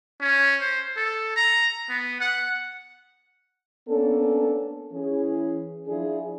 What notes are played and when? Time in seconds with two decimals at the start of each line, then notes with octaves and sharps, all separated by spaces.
0.21 C#4
0.61 C5
0.97 A4
1.36 A#5
1.89 B3
2.21 F#5
3.88 A#3 B3 C#4 D4 A4
4.92 E3 C#4 G#4
5.87 F3 D4 E4 G#4